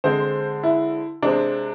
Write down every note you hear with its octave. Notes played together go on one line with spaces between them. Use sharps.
D3 G#3 C4 C5
E4
C3 G#3 C4 D4